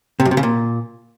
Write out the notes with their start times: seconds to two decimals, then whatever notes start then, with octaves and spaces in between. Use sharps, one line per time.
0.20 C3
0.25 F#2
0.31 C3
0.37 C#3
0.43 A#2